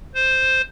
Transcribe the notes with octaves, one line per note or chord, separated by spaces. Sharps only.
C5